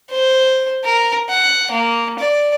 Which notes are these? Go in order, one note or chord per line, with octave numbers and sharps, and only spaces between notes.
C5
A#4
F#5
A#3
D5